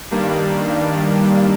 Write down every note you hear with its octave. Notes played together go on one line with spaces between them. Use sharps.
G2 D#3 G3 A#3 D4